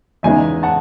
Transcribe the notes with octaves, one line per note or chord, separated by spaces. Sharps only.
E2 C#3 G#3 B3 D#4 E5 G#5
F#5 A5